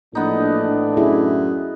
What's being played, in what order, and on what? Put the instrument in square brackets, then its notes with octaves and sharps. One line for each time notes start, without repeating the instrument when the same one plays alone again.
[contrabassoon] A#1 [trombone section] A2 E3 D4 [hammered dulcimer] B3 D#4
[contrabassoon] F#2 [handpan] E4 G#4